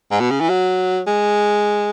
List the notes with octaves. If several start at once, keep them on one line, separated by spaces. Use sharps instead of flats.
G#2
B2
C#3
E3
F#3
G#3